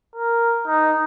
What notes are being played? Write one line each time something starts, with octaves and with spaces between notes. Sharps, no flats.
A#4
D#4